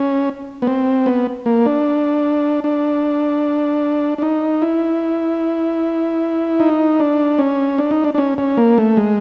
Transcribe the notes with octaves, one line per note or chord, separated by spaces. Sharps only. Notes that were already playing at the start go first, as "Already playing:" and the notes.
Already playing: C#4
B3
C4
B3
A#3
D4
D4
D4
D#4
E4
D#4
D4
C#4
D4
D#4
D4
D4
C#4
C#4
A#3
A3
G#3